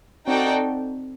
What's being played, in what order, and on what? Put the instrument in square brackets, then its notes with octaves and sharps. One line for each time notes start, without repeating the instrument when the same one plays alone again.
[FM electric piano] C4 [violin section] D#4 F#4 A4 D5 G5